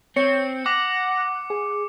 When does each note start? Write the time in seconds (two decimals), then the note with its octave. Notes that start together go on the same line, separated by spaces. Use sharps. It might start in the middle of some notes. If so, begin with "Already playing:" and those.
0.17 C4 C#5 C#7
0.66 F#5 D6 A#6
1.50 G#4